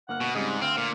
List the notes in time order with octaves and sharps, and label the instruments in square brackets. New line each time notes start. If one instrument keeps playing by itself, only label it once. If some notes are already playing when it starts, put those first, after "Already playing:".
[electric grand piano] G1 A#3 F6 [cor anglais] F#5
[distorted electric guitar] B2
[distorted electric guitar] G#2 [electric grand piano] C#3 G3 C4 [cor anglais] D#5
[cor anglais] D4
[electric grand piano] D2 [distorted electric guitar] C4 [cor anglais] F5
[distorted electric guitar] A#2